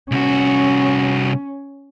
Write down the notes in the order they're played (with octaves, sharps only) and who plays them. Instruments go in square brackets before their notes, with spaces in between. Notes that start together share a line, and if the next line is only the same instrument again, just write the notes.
[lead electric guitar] C2 F#4 [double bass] C#4